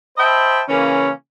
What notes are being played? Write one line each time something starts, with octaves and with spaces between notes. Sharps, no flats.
C5 D#5 E5 G5 A5 B5
C#3 E3 A#3 C#4